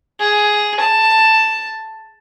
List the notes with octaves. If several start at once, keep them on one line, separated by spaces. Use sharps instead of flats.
G#4
A5